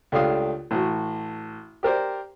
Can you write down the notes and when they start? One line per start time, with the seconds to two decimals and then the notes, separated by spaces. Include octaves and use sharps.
0.12 C#2 A3 D4 G4 F5 D#6
0.71 A1 F#4
1.83 G4 A#4 C5 D5